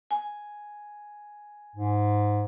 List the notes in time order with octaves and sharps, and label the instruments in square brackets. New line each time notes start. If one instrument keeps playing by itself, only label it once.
[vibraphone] G#5
[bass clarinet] G#2